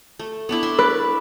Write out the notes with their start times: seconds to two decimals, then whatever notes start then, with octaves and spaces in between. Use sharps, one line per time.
0.19 A3
0.49 B3 D4 E4
0.63 E5 C6
0.79 B4 D5